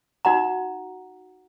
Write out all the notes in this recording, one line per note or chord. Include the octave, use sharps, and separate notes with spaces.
D#4 F#4 F#5 A#5